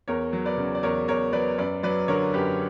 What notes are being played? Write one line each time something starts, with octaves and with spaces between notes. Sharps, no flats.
E2 A#4 C#5
F#3
B4 D5
C#3
D5
E2 A#4 C#5
E2 A#4 C#5
F#3 B4 D5
F#2 B4 D5
F#3 B4 D5
D3 A#4 C#5
F#2 G4 B4